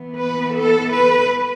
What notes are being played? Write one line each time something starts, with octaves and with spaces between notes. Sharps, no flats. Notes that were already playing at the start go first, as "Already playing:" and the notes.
Already playing: E3 B3
B4
A4
B4